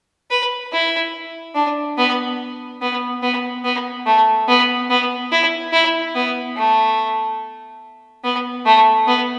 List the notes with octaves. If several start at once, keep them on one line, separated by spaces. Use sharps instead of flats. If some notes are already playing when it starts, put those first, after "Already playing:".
B4
E4
D4
B3
B3
B3
B3
A3
B3
B3
E4
E4
B3
A3
B3
A3
B3